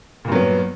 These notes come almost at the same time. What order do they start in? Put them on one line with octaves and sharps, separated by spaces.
A#2 G2 F#3 B3